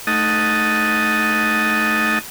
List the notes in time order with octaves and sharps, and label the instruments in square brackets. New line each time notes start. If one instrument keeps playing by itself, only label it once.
[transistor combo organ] A3 D#4 D#5 F#5 A5 D#6